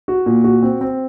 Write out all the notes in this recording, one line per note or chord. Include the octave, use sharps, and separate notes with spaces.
F#4
A#2
F#4
C4
C4